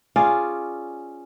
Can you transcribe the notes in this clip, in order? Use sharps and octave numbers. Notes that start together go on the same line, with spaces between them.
C#4 F4 G#4 D5